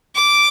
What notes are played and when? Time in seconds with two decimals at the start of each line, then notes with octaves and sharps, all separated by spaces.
0.16 D6